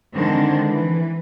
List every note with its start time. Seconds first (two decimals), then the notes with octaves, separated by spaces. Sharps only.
0.15 D3 D#3 G#3 C4 D4
0.69 E3